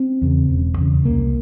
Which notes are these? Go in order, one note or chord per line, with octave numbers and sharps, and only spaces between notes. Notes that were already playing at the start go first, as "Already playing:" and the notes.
Already playing: C4
E2 C#3
E1
E2 C#3
C2 A#3